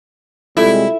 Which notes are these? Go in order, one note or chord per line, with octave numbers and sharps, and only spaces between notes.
C3 G3 G#3 E4 F4 A4